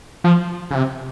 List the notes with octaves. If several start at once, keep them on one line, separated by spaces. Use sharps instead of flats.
F3
C#3
C3